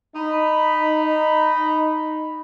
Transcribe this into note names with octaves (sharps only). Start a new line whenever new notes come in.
D#4 B5